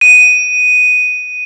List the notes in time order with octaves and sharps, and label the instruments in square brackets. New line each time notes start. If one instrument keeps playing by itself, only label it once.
[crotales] D#7